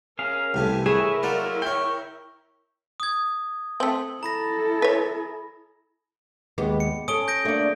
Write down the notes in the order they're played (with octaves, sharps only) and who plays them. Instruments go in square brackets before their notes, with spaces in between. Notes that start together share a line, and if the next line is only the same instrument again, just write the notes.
[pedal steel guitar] C#4 G#4 F5 [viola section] A#4
[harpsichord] C2 E3 A3 [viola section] G4 G#5
[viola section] E4 A#4 [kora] G#4 [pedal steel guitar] B4 C#5 E5
[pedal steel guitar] F#3 A3 F4 [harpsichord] A#3 D5 F#5
[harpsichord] C#5 F5 [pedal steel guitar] G5 C#6
[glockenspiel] D#6 G#6
[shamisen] A3 C4 [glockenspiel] F#7
[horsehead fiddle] E4 A4 [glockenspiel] A#5 B5 A#6
[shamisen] B4 C#5
[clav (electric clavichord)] D#2 G#3 [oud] B3 G4
[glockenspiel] C#7
[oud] C#4 [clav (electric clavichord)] A4 G#5 [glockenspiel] D#6 D7 G7
[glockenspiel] G6 A#6 D7
[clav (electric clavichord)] A3 A#3 D4 [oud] F#4 D5